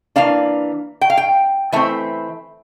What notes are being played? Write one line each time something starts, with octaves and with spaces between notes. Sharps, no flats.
E3 A#3 D4 F5
G5
F5
G5
E3 A3 C4 E5